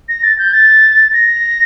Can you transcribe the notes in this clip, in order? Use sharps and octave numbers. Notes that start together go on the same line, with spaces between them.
A#6
A6
G6
A6
A#6